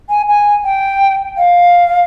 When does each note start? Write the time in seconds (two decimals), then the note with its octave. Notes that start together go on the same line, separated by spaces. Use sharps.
0.09 G#5
0.28 G#5
0.64 G5
1.38 F5